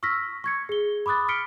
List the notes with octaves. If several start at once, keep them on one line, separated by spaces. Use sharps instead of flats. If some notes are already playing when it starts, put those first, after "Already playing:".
C#6 E6 F6 A#6 B6
C#6 G#6 C#7
G#4 G7
B5 D6 D#6 F#6 A6
F6 B6 C#7 D7 G7